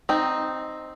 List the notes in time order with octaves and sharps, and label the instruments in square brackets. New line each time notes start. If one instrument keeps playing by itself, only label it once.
[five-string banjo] C4 D#4